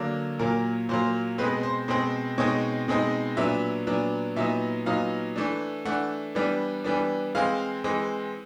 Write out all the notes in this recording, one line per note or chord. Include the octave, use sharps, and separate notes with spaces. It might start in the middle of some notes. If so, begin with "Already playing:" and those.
Already playing: D3 F#3 A#3 D4
A#2 F#3 A#3 A#4
A#2 F#3 A#3 C5
B2 G#3 C4 B4
C5
B2 G#3 C4 C5
B2 G#3 C4 D#4 C#5
B2 G#3 C4 D#4
A#2 F#3 B3 D4 E5
A#2 F#3 B3 D4
A#2 F#3 B3 D#4 E5
A#2 F#3 B3 D#4 F5
E3 A3 D4
E3 A3 D4 F#5
E3 G3 B3 D4
E3 G3 B3 D4
E3 G#3 C4 F5
E3 G#3 C4